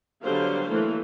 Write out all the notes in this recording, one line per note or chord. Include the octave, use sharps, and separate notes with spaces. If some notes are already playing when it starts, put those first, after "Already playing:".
D3 F#3 G3 B3 C5 F5
E3 A3 A#3